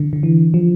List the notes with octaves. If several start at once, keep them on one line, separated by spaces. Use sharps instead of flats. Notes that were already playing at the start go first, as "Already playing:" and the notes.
Already playing: D3
D3
E3
F3